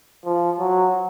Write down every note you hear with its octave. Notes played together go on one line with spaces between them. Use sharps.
F3
F#3